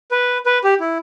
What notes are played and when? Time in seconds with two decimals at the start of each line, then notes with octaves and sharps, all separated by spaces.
0.11 B4
0.46 B4
0.64 G4
0.80 E4